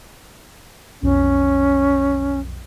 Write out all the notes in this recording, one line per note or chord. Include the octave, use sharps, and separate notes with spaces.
B1 F2 C#4